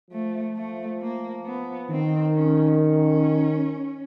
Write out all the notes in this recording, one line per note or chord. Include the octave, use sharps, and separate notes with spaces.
F3 A3
A3
A#3
B3
D#3 C4
C#4
C#4